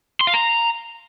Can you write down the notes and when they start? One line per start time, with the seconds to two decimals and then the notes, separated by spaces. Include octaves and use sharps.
0.21 C6
0.27 F5
0.34 A#5